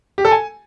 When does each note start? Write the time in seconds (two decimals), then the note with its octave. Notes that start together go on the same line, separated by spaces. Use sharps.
0.18 G4
0.25 A4
0.31 G#5